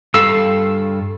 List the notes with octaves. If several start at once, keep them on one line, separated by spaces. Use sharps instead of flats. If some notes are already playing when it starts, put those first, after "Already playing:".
G2 A4 F5 E6